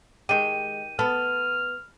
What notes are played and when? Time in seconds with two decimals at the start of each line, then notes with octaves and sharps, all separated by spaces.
0.29 D#3 G#3 G4 D#7
0.99 B3 A4 F6